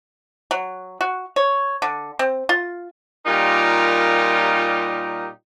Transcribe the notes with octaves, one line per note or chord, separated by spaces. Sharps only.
F#3
F#4
C#5
D3
C4
F4
A#2 G3 D#4 F4 G4 A#4